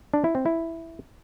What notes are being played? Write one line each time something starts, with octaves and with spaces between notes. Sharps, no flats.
D4
E4
C4
E4